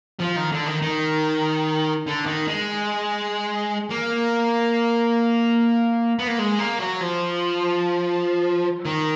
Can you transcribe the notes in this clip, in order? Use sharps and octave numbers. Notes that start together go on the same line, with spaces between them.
F3
D#3
D3
D#3
D#3
D3
D#3
G#3
A#3
B3
A#3
G#3
A#3
F#3
F3
D#3